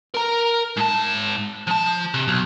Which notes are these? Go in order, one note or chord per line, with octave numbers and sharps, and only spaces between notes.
A#4 A#5
G#2 A5
F3 A5
C3
B1